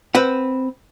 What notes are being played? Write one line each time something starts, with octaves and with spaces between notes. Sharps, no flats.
C4 B4 F#5